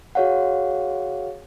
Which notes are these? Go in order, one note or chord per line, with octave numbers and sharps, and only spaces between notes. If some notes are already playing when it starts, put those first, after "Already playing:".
F#4 G#4 C#5 F5 F#5